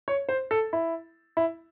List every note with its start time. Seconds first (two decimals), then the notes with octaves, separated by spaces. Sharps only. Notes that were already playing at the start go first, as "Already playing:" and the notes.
0.08 C#5
0.29 C5
0.51 A4
0.73 E4
1.37 E4